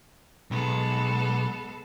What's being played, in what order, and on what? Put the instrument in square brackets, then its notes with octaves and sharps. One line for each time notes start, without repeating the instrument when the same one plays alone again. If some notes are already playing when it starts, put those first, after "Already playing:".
[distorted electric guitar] B1 [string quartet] G#3 B3 A4